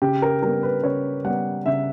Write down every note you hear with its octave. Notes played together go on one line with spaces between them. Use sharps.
C#3 G4
A#4
G3 B3 A#4
B4
C#3 C#5
G3 B3 F#5
C#3 E5